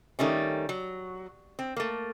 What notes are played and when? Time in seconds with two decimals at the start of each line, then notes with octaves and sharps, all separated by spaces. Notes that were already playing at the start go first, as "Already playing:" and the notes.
0.19 D#3 G3 A3 C#4
0.69 F#3
1.59 C4
1.77 A3 A#3